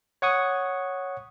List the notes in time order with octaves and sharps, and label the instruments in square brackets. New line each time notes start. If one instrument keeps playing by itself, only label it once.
[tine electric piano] C#5 F#5 C#6 D#6